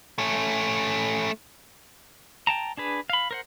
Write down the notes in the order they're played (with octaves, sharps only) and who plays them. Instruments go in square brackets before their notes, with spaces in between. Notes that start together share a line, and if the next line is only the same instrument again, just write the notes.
[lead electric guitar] A3 C#4
[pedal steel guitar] G5 A5 A#5
D4 G#4 B4
F5 B5
A#4 C5 F#5